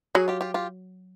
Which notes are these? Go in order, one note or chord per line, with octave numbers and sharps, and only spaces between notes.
F#3 F#4 G#4
F4 G4
F4 G4
F4 G4